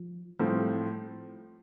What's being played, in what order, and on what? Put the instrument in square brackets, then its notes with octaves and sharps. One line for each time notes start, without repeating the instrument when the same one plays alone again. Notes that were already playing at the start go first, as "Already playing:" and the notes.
Already playing: [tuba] F3
[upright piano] A2 F3 C4 [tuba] G3